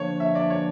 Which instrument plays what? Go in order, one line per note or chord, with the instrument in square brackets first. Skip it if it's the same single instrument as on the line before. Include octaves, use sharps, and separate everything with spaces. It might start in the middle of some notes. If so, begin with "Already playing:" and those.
Already playing: [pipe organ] D3 F3 A#3 D4 [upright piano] C#5
[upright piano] E5
D5
C#5